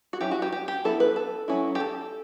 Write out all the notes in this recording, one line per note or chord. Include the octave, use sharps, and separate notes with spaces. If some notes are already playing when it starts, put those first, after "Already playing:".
F#4
F#3 C#4 E4 G4
F#4
G4
G4
G4
F#3 B3 E4 A4
B4
A4
F#3 C#4 E4
G4
A4